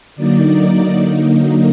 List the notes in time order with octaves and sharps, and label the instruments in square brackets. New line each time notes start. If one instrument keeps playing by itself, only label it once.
[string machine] D3 F#3 A#3 D#4 D5